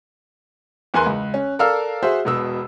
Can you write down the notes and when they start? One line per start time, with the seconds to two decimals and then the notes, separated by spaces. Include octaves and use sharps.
0.94 E2 E3 A#4 G#5 C6 F#6
1.06 C#2
1.34 C#4
1.59 A4 A#4 D5 F5 E6 F6
2.03 F#4 G#4 C5 E5
2.25 E1 B2 E6